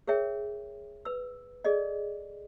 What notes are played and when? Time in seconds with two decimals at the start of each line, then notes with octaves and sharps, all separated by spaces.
0.07 G#4 A#4 C#5 E5 G5
1.05 B4 E6
1.64 G#4 A4 D5 D#5